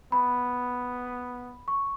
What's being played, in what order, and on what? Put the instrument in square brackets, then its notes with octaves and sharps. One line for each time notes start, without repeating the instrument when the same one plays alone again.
[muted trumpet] B3 [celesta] B5
[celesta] C#6